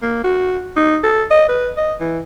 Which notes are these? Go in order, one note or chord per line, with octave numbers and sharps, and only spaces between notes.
A#3
F#4
D#4
A4
D#5
B4
D#5
E3